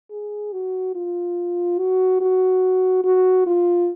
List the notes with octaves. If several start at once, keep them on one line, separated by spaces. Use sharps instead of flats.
G#4
F#4
F4
F#4
F#4
F#4
F4